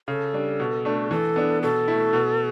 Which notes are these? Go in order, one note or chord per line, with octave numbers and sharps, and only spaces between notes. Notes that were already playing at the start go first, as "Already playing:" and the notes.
C#3 A4
G3 D4
B2
A3 D4
E3 A4
B3 D4
B2 A4
A3 E4
B2